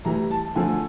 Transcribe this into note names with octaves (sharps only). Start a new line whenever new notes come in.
A2 E3 G3 A#5
A5
D3 F3 A3 G#5